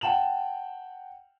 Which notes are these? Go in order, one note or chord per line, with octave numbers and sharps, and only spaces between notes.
F#5 G5 A5 E7 F#7